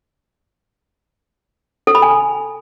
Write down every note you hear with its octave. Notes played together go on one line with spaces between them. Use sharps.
A4
B5
G#5